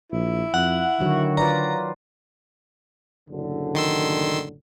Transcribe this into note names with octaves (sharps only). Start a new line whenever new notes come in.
A#1 E4
F2 F#5
D3 D#3 F#3 F#4
F4 B4 D5 A#5
F#1 A2 D3
D#3 C6 E6